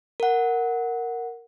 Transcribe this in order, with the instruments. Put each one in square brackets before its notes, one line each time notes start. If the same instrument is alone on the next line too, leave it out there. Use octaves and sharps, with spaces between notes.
[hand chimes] A#4 F#5